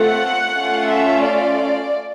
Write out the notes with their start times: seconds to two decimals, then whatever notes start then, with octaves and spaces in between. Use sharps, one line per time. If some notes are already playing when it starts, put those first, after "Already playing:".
Already playing: A3 C4 F4 A4 F#5
0.56 A3 C#4 F4
0.90 E5
1.23 D5